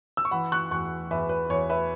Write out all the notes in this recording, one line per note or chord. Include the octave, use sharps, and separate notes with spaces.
E6
C#6
E3 F#5 B5
C#6 F#6
E2 C#6 F#6
E2 B4 E5
B4
E2 C#5
B4 E5